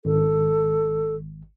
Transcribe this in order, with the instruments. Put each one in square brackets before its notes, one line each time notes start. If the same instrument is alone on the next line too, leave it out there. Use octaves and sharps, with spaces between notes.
[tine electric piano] G#1 [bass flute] A4